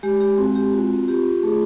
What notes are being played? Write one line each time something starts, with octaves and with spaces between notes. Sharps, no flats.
G#3 G4
G4
C4 F#4
G4
F4 F#4
F4 G4
A3 G#4